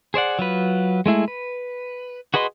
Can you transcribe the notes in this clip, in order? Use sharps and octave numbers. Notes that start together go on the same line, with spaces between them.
G#4 C5 D5 F#5
F#3 F4 B4
G#3 A3 E4 G#4
B4
F#4 G#4 B4 D#5 C6